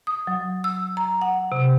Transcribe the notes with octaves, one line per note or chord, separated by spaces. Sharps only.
D#6
F#3
E6
A#5
F#5
C3